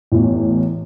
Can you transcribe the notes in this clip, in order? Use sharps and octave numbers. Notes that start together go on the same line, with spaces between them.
A1 E2